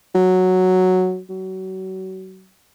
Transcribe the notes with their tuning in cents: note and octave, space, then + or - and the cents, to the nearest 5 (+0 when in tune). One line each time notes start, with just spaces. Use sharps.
F#3 +0
F#3 +30